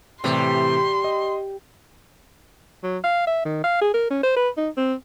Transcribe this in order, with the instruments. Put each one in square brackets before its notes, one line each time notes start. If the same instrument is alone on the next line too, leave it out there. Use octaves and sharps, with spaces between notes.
[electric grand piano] A2 C3 E3 [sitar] G3 [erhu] C6
[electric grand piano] D#5
[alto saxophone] F#3
F5
E5
D#3
F5
G#4
A#4
C#4
C5
B4
D#4
C4